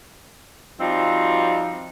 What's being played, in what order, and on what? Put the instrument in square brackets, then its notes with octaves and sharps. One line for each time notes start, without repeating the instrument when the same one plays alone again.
[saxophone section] F3 G3 C4 D#4 F4 F#4